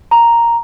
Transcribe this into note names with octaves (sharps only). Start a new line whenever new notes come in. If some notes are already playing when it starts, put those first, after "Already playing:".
A#5